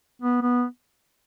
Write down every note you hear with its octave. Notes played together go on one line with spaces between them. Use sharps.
B3
B3